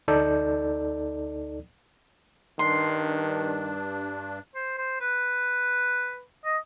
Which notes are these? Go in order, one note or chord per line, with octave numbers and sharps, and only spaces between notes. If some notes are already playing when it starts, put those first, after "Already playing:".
D2 D#4 A4 D5 G6
G2 D#3 D4 C6
C5
C5
B4
D#5